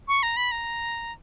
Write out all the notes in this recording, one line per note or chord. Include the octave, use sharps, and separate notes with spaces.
C#6
A#5
B5
A#5